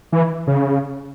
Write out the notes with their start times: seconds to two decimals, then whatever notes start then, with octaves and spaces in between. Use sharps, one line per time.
0.12 E3
0.47 C#3